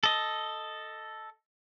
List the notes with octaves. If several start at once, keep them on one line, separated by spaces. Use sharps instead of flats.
A4 D#5